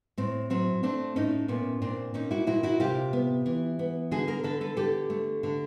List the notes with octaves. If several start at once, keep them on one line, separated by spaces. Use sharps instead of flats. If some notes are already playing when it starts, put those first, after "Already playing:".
A2 C4
F#3 C4
A3 C4 D4
A2 C#4 D#4
A#2 B3 C#4
A#2 C4 D4
A#2 C#4 D#4
E4 F#4
A#2 E4 F#4
E4 F#4
C3 F4 G4
B3
E3
B3
D3 F#4 G#4
G#4 A#4
D3 A4 B4
A4 B4
D3 G4 A4
A3
D3